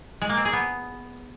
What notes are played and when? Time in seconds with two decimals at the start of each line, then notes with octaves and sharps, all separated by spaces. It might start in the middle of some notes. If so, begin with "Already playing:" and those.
0.21 G#3
0.29 A#3
0.37 C4
0.45 G#4
0.53 B3